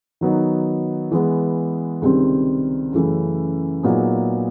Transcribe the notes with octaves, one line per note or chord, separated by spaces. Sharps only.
D#3 F#3 B3 D#4
E3 G#3 B3
C#2 C3 D#3 G3 C4
F#2 C#3 E3 A3
A#2 F#3 B3 D#4 G#4